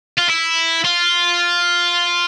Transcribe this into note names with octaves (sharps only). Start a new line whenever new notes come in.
F4
E4
F4